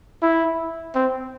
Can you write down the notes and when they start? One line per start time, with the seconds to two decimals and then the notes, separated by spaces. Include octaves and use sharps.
0.22 E4
0.95 C4